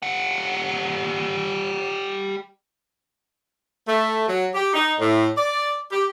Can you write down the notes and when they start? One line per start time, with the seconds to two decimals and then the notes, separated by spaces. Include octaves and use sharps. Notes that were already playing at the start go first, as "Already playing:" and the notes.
0.02 G3 F#5
3.87 A3
4.27 F#3
4.54 G4
4.74 D#4
4.99 A2
5.36 D5
5.91 G4